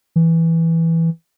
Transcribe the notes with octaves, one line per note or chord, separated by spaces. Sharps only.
E3